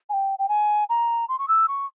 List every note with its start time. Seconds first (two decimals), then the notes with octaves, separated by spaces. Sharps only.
0.09 G#5
0.13 G5
0.39 G5
0.49 G#5
0.89 A#5
1.29 C6
1.39 C#6
1.48 E6
1.68 C#6